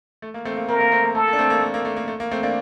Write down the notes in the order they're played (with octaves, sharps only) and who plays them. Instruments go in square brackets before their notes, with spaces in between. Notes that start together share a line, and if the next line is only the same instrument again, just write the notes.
[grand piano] A3
A#3
A3 C4
A#3
[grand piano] A3 C4 [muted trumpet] A#4
[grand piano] A#3
A3 C4
A#3
[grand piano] A3 [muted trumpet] A4
[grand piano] A#3
D4
A3 C4
A#3
A3
A#3
A3
A#3
A3
A#3
A3 C4
A#3 D4